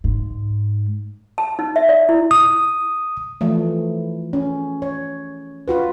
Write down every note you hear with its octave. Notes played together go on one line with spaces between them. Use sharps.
G#2
A5
D#4
E5
D5
E4
D#6
E3 F3 A3
C#4
C#5
F4 F#4 B4